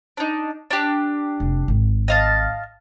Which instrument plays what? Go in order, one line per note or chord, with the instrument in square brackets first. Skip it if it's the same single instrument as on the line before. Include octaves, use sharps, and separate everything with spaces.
[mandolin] D4 D#4
D4 G4
[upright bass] F1
G#1
[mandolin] D#5 F5 A5